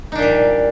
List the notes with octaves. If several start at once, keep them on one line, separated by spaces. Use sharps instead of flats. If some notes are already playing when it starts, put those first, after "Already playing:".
A#2 G3 D4 D#4